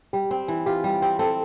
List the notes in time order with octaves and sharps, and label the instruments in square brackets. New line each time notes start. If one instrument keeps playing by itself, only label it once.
[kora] G3 [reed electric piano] G4
[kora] C4
E3
[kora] F4 [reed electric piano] G4
[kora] G3
C4
[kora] C4 [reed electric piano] A4